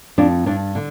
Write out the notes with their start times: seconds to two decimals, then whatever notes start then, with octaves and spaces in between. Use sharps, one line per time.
0.18 F2 D4
0.46 G2 D4
0.75 D3